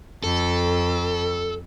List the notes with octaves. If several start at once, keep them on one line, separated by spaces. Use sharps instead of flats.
F2 A4